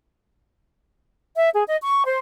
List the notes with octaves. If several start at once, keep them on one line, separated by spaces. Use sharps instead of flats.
E5
G#4
D#5
C#6
C5